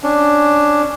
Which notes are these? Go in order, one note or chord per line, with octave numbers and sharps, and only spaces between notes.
C#4 D4